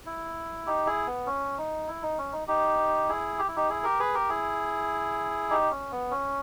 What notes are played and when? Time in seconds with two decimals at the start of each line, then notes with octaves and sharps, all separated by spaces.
0.06 E4
0.66 D#4 G4
0.86 E4 G#4
1.07 B3
1.26 C#4
1.58 D#4
1.88 E4
2.03 D#4
2.18 C#4
2.32 D#4
2.47 D#4 G4
3.09 E4 G#4
3.39 G4
3.48 E4
3.56 D#4 G4
3.69 E4 G#4
3.84 G4 A#4
4.00 G#4 B4
4.14 G4 A#4
4.29 E4 G#4
5.50 D#4 G4
5.71 C#4
5.92 B3
6.11 C#4